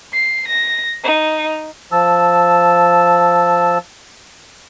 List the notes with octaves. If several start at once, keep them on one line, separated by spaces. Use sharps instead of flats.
C7
A#6
D#4
F3 A5 E6